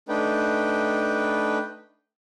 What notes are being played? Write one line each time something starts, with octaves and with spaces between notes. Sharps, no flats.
A3 D4 D#4 B4 G5